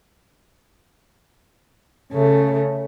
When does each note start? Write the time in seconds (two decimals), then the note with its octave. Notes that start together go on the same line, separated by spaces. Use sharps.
2.12 C#3 A3 C#4